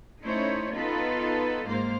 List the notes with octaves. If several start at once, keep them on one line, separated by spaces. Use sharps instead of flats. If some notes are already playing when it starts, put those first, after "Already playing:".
A3 C#4 D#4 E4 C5 C#5
B3 D#4 F4 A4 B4
G#2 A#3 C5 F5